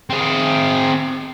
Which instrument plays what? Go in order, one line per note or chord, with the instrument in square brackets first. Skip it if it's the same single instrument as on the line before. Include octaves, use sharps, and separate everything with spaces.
[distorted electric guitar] C4 G#4